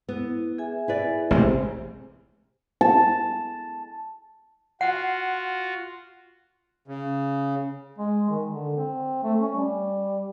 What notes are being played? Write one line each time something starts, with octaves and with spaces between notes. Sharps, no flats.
B3 E4
G#4 E5 G#5
E4 B4 D5
A1 C3 G#3 C4 G4
A5
F4 F#4 F#5
C#3
G#3
D#3
D3
C4
A3
C#4
G3